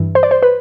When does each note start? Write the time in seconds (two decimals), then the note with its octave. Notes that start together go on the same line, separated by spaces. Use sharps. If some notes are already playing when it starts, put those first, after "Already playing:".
Already playing: G2 E3
0.15 C5
0.23 D5
0.31 C5
0.43 B4